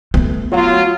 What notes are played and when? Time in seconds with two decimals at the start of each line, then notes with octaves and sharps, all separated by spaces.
0.14 A3 B3
0.53 F#3 F4